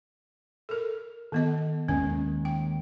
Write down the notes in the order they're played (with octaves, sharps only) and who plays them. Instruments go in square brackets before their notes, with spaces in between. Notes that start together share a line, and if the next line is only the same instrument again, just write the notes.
[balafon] A4 A#4
D#3 B3 D#5
[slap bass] D#2 D#3 G#3 [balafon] C#4
[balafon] G5